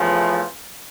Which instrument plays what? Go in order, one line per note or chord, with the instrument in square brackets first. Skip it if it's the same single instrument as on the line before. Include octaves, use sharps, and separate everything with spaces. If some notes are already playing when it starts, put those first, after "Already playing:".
Already playing: [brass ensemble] E2 C#3 F3 A3